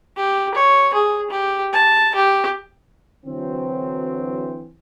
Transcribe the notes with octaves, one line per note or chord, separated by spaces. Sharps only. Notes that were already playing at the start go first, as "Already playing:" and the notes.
G4
C#5
G#4
G4
A5
G4
D3 E3 F#3 C4